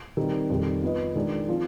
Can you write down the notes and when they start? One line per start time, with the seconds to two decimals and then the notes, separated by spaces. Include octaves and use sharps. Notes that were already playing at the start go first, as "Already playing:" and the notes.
0.17 D#3 G3 C4
0.50 F2 D#3 G3
0.83 B3 F4 B4 D#5
1.16 D#3 G#3 D4
1.48 F3 C4 F4